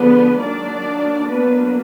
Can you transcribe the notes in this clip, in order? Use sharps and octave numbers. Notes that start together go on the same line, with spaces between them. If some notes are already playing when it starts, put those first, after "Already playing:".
Already playing: D3 F3 G#3 B3 D4 B4
D#3 F#3 A#3 D4 D5
F#3 A#3 B3 D4 B4